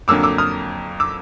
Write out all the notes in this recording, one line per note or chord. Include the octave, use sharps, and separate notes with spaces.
F2 D3 F#3 A#3 D6 E6
D6 E6
D#6 F6
D6 E6